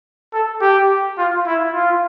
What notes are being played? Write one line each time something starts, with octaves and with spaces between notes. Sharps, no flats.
A4
G4
F4
E4
F4